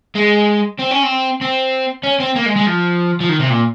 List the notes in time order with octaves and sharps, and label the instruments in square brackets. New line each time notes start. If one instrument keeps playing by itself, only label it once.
[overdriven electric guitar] G#3
C4
C#4
C4
C4
C#4
C4
A#3
G#3
G#3
F3
F3
D#3
C3
A#2